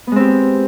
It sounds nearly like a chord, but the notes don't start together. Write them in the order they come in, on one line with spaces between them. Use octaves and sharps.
B3 G#3 C4 G4